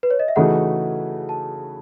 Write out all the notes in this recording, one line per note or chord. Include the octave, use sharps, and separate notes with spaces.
B4
C#5
D#5
E5
C#3 E3 A3 D#4 F#4 F#5
A5